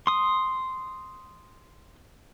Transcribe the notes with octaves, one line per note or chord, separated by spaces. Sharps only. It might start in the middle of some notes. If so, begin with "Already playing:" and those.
C6 D#6